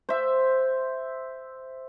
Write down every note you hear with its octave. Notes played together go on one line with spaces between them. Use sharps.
C5 E5